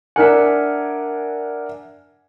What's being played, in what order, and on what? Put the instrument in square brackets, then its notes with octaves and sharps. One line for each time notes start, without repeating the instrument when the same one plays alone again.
[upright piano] D4 A#4 G#5 [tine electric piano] E5 F#5